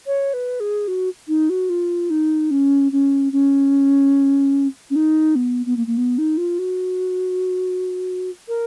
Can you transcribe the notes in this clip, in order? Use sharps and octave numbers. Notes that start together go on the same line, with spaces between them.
C#5
B4
G#4
F#4
D#4
F#4
F4
D#4
C#4
C#4
C#4
C#4
D#4
B3
B3
A#3
A#3
B3
D#4
F4
F#4
A#4